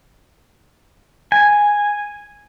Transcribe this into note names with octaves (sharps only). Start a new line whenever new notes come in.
G#5